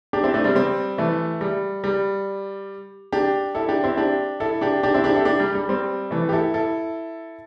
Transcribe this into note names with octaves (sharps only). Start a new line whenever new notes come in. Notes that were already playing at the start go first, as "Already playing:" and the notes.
D4 G4
C4 E4
A3 D4
G3 C4
G3 C4
E3 A3
G3
G3
D4 G4
E4 A4
D4 G4
C4 E4
D4 G4
E4 A4
D4 G4
D4 G4
C4 E4
D4 G4
E4 A4
D4 G4
G3
G3
G3 C4
E3 A3
G4
E4 A4
E4 A4